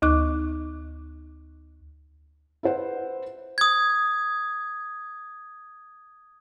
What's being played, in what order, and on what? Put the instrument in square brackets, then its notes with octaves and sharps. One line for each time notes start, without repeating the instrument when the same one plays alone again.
[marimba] D2 D#4 D6 F#6
[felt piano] E4 B4 C5 F#5
[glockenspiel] D#6 G#6